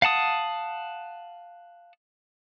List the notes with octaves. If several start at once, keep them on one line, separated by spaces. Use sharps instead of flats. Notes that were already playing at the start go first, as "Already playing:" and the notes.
F5 F#5 A5 D#6